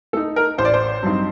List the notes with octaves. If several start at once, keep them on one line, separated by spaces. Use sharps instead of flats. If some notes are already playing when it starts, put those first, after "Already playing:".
A3 D#4 A4
A#4
A1 C5
D5
C5
G2 F#3 C4 D#4